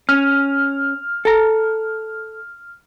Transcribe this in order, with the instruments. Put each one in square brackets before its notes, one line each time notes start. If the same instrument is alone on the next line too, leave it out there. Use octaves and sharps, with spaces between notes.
[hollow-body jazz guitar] C#4 [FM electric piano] F6
[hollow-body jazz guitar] A4 A#5